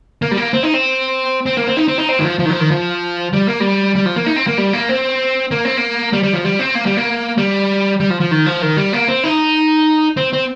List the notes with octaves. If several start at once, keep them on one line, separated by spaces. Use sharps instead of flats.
A#3
G3
A#3
C4
D#4
C4
C4
A#3
C4
D#4
C4
D#4
C4
D#3
F3
F3
D#3
F3
D#3
F3
G3
A#3
G3
G3
F3
A#3
D#4
C4
A#3
G3
A#3
C4
A#3
C4
A#3
G3
G3
F3
G3
C4
A#3
G3
A#3
G3
G3
F3
F3
D#3
F3
D#3
G3
A#3
C4
D#4
C4
C4